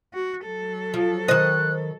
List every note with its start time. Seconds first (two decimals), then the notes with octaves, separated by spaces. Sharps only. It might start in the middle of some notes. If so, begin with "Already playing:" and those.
0.14 F#4
0.45 F#3 A4
0.94 F3
1.28 D#3 C5 D#5 F#6